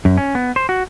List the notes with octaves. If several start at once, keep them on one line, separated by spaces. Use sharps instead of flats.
F#2
C#4
B3
C5
F#4